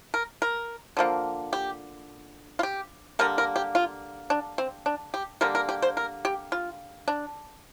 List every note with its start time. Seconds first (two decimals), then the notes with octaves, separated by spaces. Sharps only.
0.14 A#4
0.42 A#4
0.97 D3 F3 A#3
1.53 G4
2.59 F4
2.63 G4
3.19 D3 G3 A#3 A#4
3.38 A#4
3.56 G4
3.75 F4
4.30 D4
4.58 C4
4.86 D4
5.14 G4
5.41 D3 G3 A#3 A#4
5.55 A#4
5.69 G4
5.82 C5
5.97 A#4
6.25 G4
6.52 F4
7.08 D4